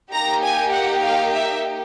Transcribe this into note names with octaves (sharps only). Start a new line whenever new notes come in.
A#3 D#4 G4 A#5
G#5
F#5
F5
E5